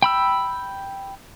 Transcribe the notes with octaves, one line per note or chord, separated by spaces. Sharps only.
G5 B5 E6